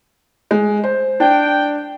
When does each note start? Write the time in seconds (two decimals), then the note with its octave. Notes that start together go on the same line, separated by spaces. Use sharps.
0.51 G#3
0.84 C5
1.20 D4 G5